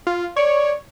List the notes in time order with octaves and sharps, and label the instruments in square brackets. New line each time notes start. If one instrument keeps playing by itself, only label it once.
[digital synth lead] F4
[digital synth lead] C#5 [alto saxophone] D5